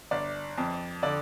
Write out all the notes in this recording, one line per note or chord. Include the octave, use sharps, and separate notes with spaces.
G1 D5
F2
D3 D5